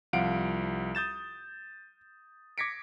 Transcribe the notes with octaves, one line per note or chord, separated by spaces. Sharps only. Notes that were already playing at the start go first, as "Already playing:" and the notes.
C2 F3 F5 F#5 D7
D#6 G6 A6 E7
D6 G#6 A#6 B6 C#7 D7